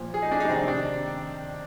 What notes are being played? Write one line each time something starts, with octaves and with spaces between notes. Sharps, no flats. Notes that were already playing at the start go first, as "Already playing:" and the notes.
Already playing: A#2 F3
G#4
D#4
D4
D#4
D4
C3 D#3 C4
D4